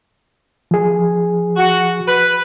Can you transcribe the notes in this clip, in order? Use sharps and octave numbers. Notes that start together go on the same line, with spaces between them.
F3 G#4
F#4
B4